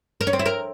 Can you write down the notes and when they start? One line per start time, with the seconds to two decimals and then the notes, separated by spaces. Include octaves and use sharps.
0.21 A#4
0.27 C#4
0.33 C4
0.39 E4
0.46 A#4